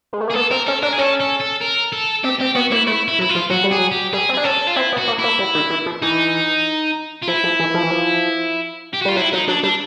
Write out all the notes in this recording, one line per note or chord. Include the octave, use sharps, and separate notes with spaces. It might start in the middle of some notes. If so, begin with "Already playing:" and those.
G#3
A3
A#3
G#4
B3 A4
C4 A#4
C#4 A4
D4 A#4
G#4
C#4 A4
A4
A4
A#4
A4
C4 G4
C4 G4
B3 F#4
A#3 E4
A3 E4
E4
F#3
E4
F4
F3
F#3 F#4
G3
G#4
F#3
G4
G3 G#4
C4
D4 G#4
C#4 A4
F4
C4 E4
B3
F#4
A#3
E4
A#3
G3
D#3
E3
F3
E3 D#4
F4
F3 E4
F3
E3
F3
E3
F3
G4
F#4
G3 F4
F#3 E4
F#3 D#4
F#3 D4
G3 D4